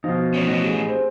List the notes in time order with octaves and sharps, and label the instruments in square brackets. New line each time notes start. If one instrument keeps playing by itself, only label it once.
[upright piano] B2 F3 [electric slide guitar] D#4 F4
[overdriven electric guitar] A2 C#4
[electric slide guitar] A3 D#5 F#5
[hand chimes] G4 G#4
[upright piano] C4